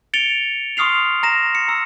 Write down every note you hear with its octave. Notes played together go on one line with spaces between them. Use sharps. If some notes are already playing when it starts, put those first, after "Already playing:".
A6 C#7 D7 F7 G7
C6 C#6 D#6 F6 C7 F7
A#5 A#6 E7
C#7
A#5 E6